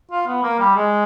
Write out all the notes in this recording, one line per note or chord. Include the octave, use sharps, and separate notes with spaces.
F4
B3
A#3
G3
G#3